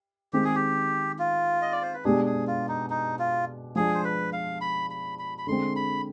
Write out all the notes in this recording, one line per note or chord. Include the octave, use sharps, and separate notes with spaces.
D#3 G#3 C4 G4
G#4
G4
F4
D#5
D5
C5
B4
B2 G#3 B3 D4 G4 G#4
G#4
F4
D#4
D#4
F4
F3 G#3 D4 G#4
C5
B4
F5
B5
B5
B5
B5
D3 G#3 C4 C6
B5